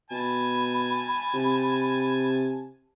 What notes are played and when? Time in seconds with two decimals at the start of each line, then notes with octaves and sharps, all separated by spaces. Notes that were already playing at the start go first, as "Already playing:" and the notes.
0.11 B2 G#5 A5 B5
1.33 C3